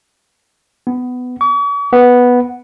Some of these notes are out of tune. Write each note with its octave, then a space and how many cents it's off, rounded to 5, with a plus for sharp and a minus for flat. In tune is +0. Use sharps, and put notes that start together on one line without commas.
B3 +15
C#6 +45
B3 -5